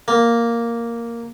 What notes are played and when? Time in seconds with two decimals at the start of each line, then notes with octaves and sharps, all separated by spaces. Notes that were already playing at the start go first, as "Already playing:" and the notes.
0.08 A#3